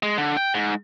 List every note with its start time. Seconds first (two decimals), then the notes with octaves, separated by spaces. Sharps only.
0.03 G#3
0.18 D3
0.37 G5
0.54 G#2